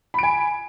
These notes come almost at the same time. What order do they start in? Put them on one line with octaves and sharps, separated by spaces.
B5 D7 G#5